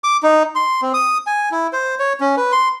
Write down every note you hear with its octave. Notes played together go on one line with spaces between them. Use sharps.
D6
D#4
C6
C4
D#6
G#5
E4
C5
C#5
C#4
B4
C6